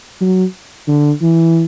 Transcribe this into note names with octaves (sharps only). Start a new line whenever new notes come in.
F#3
D3
E3